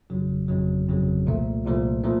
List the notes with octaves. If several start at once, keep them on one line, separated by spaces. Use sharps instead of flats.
G1 F2 C#3 F#3
G1 F2 C#3 F#3
G1 F2 C#3 F#3
C2 A#2 F3 A3
C2 A#2 F3 A3
A#2 F3 A3